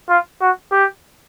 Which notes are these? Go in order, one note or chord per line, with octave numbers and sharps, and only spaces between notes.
F4
F#4
G4